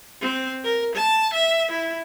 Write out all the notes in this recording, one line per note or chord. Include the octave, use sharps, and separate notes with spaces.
C4
A#4
A5
E5
E4